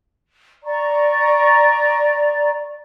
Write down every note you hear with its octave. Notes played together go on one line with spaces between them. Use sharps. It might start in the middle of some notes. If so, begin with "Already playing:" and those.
D5 A#5 C#6